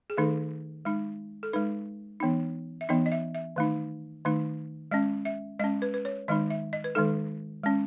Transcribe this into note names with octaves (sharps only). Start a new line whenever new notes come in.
G#4
D#3 A3 D#4 A4
G#3 D#4
A4
G#3 D#4 B4
E3 B3 D#4
E5
E3 B3 D#4 D#5
D#5
E5
E5
D#3 A3 D#4
D#3 A3 D#4
G#3 C#4 D#5
E5
G#3 C#4 D#5
B4
B4
C#5
D#3 G#3 D#4 D#5
E5
D#5
B4
D#3 G#3 D#4 A4
G#3 C#4